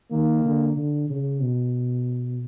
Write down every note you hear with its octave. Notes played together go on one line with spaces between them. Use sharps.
D#3 A#3
D3
D3
C#3
B2